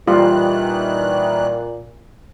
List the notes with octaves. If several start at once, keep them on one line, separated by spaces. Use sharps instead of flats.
A#2 D#3 E3 G3 F4 F#6